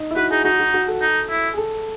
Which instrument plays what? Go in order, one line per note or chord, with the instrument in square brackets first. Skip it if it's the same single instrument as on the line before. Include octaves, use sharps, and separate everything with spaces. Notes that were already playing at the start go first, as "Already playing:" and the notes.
Already playing: [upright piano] D#4
E4
[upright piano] F#4 [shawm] B4
[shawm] D#4 [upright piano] G#4
[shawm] D#4 [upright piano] F#4
[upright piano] F#4
F#4
A4
[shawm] D#4
E4
[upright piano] G#4
A4